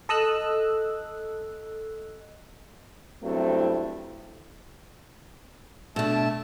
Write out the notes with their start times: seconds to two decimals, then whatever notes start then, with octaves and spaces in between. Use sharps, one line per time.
0.09 A4 D#5 E6 F#6
3.23 E2 G2 F#3 A3 C4 E4
5.96 B2 A3 D4 A5 E6